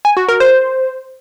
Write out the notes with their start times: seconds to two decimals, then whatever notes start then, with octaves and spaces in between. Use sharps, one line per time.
0.05 G#5
0.17 F#4
0.29 A#4
0.40 C5